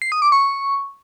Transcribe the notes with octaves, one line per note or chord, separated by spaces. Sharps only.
C7
D#6
D6
C#6